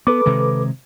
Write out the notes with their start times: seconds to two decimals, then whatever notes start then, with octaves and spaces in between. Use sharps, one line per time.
0.07 B3 A4 B4 D6
0.26 C3 D#3 G#3